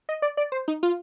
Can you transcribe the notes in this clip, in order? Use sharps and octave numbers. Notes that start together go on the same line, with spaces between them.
D#5
D5
D5
C5
D#4
F4